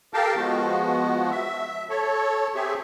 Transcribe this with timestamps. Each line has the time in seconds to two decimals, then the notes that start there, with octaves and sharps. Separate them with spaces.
0.14 G4 A4 A#4 F5 G5 A5
0.36 F3 G#3 B3 F#4
1.31 E5
1.90 A4 C#5
2.55 C4 G4 G#4 E5